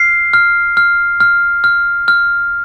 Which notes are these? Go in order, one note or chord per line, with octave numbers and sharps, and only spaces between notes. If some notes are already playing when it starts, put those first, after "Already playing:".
Already playing: F6 C7
F6
F6
F6
F6
F6